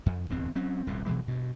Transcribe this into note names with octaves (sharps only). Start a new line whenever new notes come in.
F2
D1 E2 G2 C4
F#3 C4 C#4
D#1 C2 F2 A2
B2 E3 F#3 G#3
G2 B2